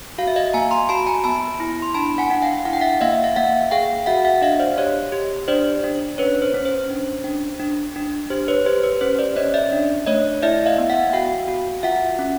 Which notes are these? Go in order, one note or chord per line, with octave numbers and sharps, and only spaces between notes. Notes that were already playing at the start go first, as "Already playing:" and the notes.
F#4 F5
E5
D#5 F5
A#3 G#5 A#5
A#5 C6
F#4 A5 B5
G#5 A#5
B3 A5 B5
E4
C6
D4 A5 B5
F#5 G#5
D4 F#5
F5 G5
E4 F#5
G5
E5 F#5
A#3 D#5 F5
E5
F5
A#3 E5 F#5
G#4 F5 G5
F#4 E5 F#5
E5 F#5
D4 D#5 F5
C5 D5
G4 C#5 D#5
G4
D4 C5 D5
D4
C#4 B4 C#5
C5
C#4
C5
D4
D4
D4
D4
G4 C5
B4 C#5
G4 C5
B4
C#4 C5
C5 D5
C#4 C#5 D#5
D5 E5
D4
A3 C#5 D#5
E4 D5 E5
D#5 F5
B3
E5 F#5
F#4 F5 G5
F#4
F4 E5 F#5
C#4